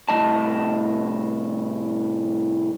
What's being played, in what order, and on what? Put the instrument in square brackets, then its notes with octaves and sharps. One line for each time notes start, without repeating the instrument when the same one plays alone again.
[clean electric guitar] C2 A2 D#3 A#3 D#5 A5